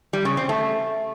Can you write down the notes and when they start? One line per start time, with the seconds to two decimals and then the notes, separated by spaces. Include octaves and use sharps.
0.13 G3
0.25 C#3
0.37 C4
0.49 A3